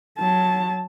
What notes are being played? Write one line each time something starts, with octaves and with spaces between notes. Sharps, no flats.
F#3 A5